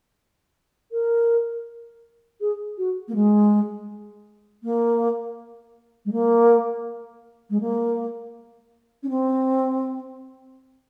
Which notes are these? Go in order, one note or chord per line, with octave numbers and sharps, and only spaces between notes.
A#4
G#4
F#4
A#3
G#3
A#3
G#3
A#3
G#3
A#3
C#4
C4